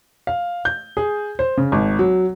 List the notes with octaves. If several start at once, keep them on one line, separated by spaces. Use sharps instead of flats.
F5
G6
G#4
C5
C#3
G#1
F#3